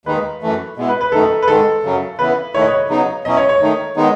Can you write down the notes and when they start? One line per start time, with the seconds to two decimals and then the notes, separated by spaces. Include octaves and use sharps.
0.05 D#2 D#3 G#3 D#4 B4
0.42 F#2 E3 A3
0.77 B2 G#3 B3 E4
0.89 B4
1.01 B4
1.12 F#2 D#3 A3 D#4 A4
1.42 B4
1.48 G#2 D#3 G#3 A4
1.83 F#2 C#3 F#3 C#4
2.19 C#3 E3 B3 E4 B4
2.54 D#3 A3 E4 C#5
2.61 D#5
2.68 C#5
2.89 C#3 F#3 B3 D#4
3.24 B2 F#3 C#4 E4 D#5
3.37 C#5
3.49 C#5
3.61 D#3 A3 D#4
3.96 D#3 G#3 B3 D#4